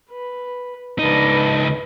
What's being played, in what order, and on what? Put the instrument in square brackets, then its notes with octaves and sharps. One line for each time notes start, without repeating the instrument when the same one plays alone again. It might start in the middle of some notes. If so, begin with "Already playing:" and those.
[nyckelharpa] B4
[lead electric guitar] C#2 D#4 [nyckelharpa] D4 B4